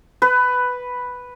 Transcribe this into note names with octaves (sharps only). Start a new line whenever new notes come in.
B4